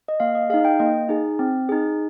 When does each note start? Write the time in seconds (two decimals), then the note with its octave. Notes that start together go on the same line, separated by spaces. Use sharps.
0.08 D#5
0.20 A#3 F5
0.35 D#5
0.50 G#4 F5
0.54 D#4
0.65 G5
0.79 A#3 D#5
1.09 D#4 G#4
1.39 C4
1.69 D#4 G#4